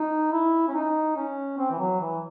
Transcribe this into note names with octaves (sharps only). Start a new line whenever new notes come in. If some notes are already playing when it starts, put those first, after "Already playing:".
Already playing: D#4
E4
C#4
D#4
C#4
C4
E3
F#3
E3